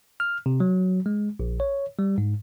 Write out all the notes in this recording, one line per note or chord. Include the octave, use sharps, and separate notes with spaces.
F6
C3
F#3
G#3
A#1
C#5
G3
G#2